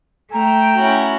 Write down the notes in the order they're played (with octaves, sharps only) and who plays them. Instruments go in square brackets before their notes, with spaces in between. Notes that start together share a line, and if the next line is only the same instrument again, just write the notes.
[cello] A3 [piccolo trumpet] G5 [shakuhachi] A#5
[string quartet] C#4 E4 F#4